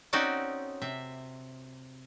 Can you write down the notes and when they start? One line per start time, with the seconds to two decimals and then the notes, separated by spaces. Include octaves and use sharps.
0.13 C4 C#4 D#4 F#4 A4 D5
0.82 C3 E5